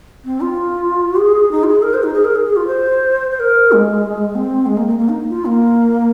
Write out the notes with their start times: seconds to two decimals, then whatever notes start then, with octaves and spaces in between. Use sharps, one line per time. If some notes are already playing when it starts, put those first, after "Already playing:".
0.25 C4
0.41 F4
1.20 G#4
1.51 D#4
1.63 F4
1.67 G#4
1.83 A#4
1.94 C5
2.03 D#4
2.14 G#4
2.25 A#4
2.35 G#4
2.46 G#4
2.56 F4
2.67 C5
3.31 C5
3.40 A#4
3.72 G#3
4.35 C4
4.66 G#3
4.77 A#3
4.87 A#3
4.99 A#3
5.09 D#4
5.30 F4
5.45 A#3